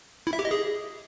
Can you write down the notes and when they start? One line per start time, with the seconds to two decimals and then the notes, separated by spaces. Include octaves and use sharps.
0.27 E4
0.33 E5
0.39 G4
0.45 D#5
0.51 G#4